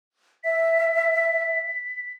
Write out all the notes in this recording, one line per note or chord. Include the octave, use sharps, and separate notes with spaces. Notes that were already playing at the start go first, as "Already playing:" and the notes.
E5 B6